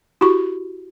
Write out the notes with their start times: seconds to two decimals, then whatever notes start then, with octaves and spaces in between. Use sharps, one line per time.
0.21 E4 F#4 G4 B5 C#6